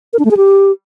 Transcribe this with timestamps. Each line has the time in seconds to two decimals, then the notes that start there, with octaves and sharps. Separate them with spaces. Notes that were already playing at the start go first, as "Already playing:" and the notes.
0.13 A#4
0.19 D4
0.25 A3
0.31 G#4
0.37 G4